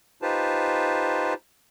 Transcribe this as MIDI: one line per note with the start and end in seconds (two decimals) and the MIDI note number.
0.22 1.34 63
0.22 1.34 65
0.22 1.34 67
0.22 1.34 71
0.22 1.34 72
0.22 1.34 81